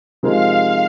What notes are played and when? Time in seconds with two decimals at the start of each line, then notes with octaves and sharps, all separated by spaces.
0.23 C3 F3 G#3 D#4 A#4 F5